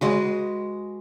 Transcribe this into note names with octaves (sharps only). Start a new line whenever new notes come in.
G#3 F#4 B4